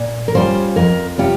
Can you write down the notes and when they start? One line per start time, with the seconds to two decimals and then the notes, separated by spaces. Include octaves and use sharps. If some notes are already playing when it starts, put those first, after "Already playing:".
Already playing: A#2
0.28 A#4
0.35 G3 C#4 F4 C5
0.76 F2 A#4
1.18 C3 G3 C#4 F4 G4